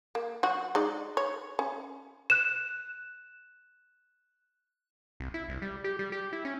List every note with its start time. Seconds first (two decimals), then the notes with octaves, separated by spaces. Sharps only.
0.15 A#3
0.43 F#3 F#4
0.75 G#3 D#4 D5
1.17 C#5
1.59 C#4
2.30 F#6 E7
5.20 C2
5.34 E4
5.49 C2
5.62 G3
5.84 G4
5.99 G3
6.12 G4
6.33 E4
6.45 C#4